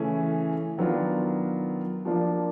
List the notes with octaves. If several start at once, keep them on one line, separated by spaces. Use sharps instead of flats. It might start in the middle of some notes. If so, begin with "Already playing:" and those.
Already playing: C#3 E3 A3 C#4
D#3 F#3 B3 D4 F4
F3 A#3 D4 F4